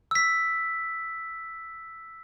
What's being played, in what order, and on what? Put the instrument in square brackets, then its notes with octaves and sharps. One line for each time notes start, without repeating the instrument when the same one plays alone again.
[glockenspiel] E6 B6